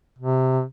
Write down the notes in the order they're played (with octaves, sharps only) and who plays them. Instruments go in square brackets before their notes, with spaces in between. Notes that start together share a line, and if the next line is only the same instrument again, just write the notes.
[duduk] C3